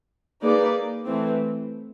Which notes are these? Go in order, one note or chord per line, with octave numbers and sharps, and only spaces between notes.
A#3 D#4 G#4 B4 D5
E3 A3 C4